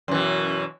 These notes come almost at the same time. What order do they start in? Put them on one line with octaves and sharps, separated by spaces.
F#2 E3 B2